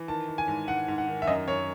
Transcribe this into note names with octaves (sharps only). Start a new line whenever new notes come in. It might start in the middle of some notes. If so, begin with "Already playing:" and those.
Already playing: E3
D#3 A5
D#3
G#5
G#2
G#2 F#5
G#2
F#5
D#3
E5
F#2 D#5
F#2 C#5